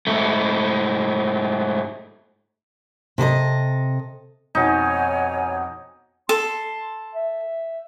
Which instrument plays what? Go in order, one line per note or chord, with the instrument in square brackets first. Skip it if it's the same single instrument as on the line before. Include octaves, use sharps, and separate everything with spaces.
[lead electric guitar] G#2 A3
[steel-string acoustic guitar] C3 A4 C5 D#5
[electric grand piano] F2 B2 [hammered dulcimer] D#4 [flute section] C#5 G#5 [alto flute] F#5
[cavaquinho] A4 [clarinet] C6
[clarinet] E5